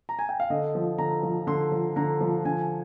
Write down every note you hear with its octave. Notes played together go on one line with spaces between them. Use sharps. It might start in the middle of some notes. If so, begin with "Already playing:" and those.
A#5
G#5
G5
F5
D3 D#5
F3
D3 A#5
F3
D3 C6
F3
D3 A#5
F3
D3 G#5